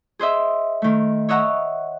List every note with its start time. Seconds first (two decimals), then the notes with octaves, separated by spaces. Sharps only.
0.19 G#4 C5 D#5 E5
0.82 D#3 A3
1.29 C#5 D#5 E5 F#5 A#5 C#6